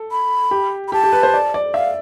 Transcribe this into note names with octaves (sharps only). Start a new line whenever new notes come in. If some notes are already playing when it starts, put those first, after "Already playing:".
Already playing: A4
B5
G4
B5
G4 A5
G4
B4
C5
D5
D5
E5 F5